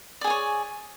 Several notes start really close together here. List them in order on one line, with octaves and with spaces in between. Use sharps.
D5 G#4 G#5 C#5